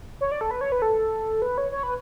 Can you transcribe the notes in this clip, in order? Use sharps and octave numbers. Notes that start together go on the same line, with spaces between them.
C#5
D5
A4
B4
C#5
B4
A4
B4
C#5
C#5
B4